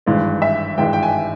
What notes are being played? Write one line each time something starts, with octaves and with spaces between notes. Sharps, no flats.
G#1 G2 E3 G#3
E5
G#1 G2 E3 G#3 G5
G5
G#5